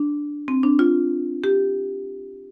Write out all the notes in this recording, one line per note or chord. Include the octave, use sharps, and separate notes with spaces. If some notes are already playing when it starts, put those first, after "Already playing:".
Already playing: D4
C4
D4
F4
G4